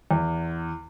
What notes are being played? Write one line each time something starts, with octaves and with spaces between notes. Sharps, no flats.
E2